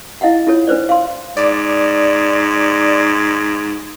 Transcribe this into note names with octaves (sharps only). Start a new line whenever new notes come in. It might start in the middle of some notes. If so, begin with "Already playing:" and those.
E4 D#5 F5 F#5
E4 F4 A4 C#5
D4 B4 C5 D5
F5 C6
G#2 D5